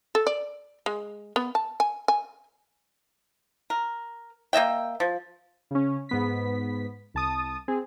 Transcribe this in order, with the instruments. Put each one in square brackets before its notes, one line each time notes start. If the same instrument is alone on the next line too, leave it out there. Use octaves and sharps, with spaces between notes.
[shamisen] A4
D5
G#3
B3
A5
G#5
G#5
[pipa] A#4
A#3 D#5 E5 G5
F3
[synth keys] C#3 C#4
G#2 B3 B6
C2 A5 D#6
C4 G#4